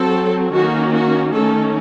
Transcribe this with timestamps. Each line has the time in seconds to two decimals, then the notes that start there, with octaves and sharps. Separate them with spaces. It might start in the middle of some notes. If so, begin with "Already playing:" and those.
Already playing: F#3 C4 A4
0.53 D#3 A#3 C#4 F#4
0.93 F#4
1.32 D#3 A3 C#4 A4